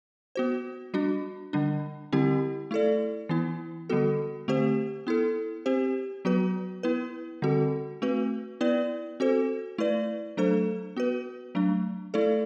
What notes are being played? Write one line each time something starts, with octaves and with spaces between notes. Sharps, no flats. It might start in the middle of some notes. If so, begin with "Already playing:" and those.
B3 F#4 C5
G3 D4 F#4
D3 G3 D4
D3 G3 C4 E4 G4
A3 E4 A4 D5
E3 B3 E4
D3 G3 B3 F#4 A4
D3 A3 C4 G4 C5
B3 E4 A4
C4 G4 C5
F#3 B3 F#4 B4
B3 E4 B4
D3 G3 C4 F#4 A4
A3 C4 F#4 B4
B3 E4 B4 D5
C4 F#4 A4 C5
A3 E4 B4 D5
F#3 A3 D4 A4 C5
B3 F#4 B4
F#3 A3 D4
A3 E4 A4 D5